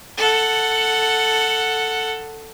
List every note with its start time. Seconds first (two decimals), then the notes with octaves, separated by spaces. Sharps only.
0.17 A4 F#5